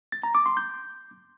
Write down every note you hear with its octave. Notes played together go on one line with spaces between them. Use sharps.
A6
A#5
D6
C6
G6